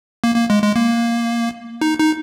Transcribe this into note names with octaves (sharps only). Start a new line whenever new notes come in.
A#3
A#3
G#3
G#3
A#3
D#4
D#4